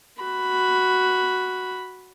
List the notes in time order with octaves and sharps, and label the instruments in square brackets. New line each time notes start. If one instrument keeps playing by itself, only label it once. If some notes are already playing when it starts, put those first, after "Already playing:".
[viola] F#4 B5